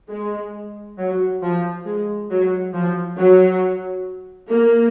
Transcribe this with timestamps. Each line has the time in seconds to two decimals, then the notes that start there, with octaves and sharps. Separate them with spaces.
0.10 G#3
0.98 F#3
1.42 F3
1.85 G#3
2.30 F#3
2.73 F3
3.18 F#3
4.49 A#3